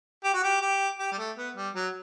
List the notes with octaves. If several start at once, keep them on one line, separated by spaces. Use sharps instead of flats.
G4
F#4
G4
G4
G4
G3
A3
B3
G3
F#3